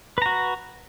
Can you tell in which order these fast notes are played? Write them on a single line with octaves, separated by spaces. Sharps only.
B4 A#5 F#4